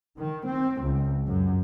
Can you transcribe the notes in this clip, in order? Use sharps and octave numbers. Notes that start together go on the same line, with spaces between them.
D#3
C4
C#2
F#2